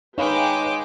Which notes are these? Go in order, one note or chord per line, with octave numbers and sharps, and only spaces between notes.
G#3 D#4 B4 C#5 F5 G5 B5 D6